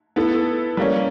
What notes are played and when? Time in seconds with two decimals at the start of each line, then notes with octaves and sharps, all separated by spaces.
0.16 B3 E4 A4
0.77 G3 A#3 C#4